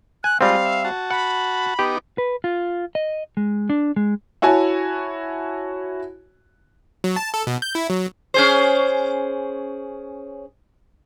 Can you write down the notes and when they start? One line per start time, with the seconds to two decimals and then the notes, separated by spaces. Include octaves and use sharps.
0.24 G#5 F#6
0.41 G3 G#3 C4 F4 F5
0.65 E5
0.84 F#4 A5
1.11 F#5 B5
1.79 B3 D#4 G4 D6
2.18 B4
2.44 F4
2.95 D#5
3.37 G#3
3.70 D4
3.96 G#3
4.42 E4 F#4 C#5 G#5 A5
7.04 F#3
7.16 A5
7.34 A4
7.47 B2
7.62 G6
7.75 E4
7.90 F#3
8.34 C#4 G#4 C5